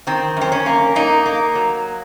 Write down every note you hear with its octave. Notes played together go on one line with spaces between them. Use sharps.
D#3 C4
F#2 C4
C#4
A#3
A#3 D#4
A#3
F#3